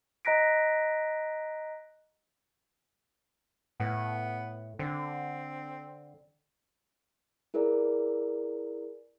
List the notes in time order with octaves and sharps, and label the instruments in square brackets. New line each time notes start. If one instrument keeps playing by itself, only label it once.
[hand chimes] D#5 A#5 F#6 A#6 B6 D7
[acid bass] A2 [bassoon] B3
[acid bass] D3 [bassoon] C4
[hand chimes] E4 G#4 A#4 B4 D5